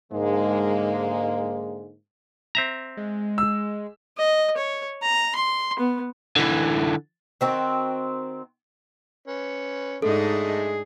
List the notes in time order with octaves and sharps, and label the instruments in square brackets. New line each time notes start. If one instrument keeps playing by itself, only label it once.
[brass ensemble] G#2 D3 G#3 A#3
[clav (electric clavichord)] C4 E5 A#5
[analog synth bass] G#3
[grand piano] E6
[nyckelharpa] D#5
C#5
A#5
C6
B3
[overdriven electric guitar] D3 E3
[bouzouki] D#3 C4 F#4
[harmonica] C#4 B4
[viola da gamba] G#2 D4 D#4 [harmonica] G#3 A3 G#4 [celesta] A4